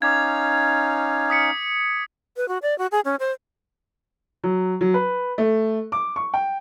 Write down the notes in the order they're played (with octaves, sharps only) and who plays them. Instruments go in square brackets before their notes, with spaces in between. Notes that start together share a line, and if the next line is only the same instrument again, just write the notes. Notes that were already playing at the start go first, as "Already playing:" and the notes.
[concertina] C#4 D#4 F5 [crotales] D6 G#6
[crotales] D#6 B6 C#7
[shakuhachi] B4
F#4
D5
F#4
G#4
C#4
C5
[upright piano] F#3
F#3
B4
A3
D6
C#6
G5